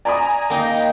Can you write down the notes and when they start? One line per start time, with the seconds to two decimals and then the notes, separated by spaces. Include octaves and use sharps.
0.05 D5 G#5 A#5 B5 D#6
0.50 A#3 D#4 G5